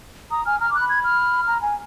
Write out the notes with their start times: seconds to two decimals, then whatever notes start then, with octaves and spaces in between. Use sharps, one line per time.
0.31 A#5 D#6
0.45 G#5 F6
0.60 A#5 F6
0.71 D6
0.75 F#6
0.80 B5
0.89 G#6
1.04 F6
1.47 A#5
1.62 G#5